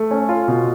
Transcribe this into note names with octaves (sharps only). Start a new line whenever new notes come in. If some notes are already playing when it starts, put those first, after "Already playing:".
Already playing: A3
C#4
F4
B2